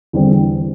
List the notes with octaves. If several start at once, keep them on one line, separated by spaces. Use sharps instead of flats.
E2 D3 G3 C4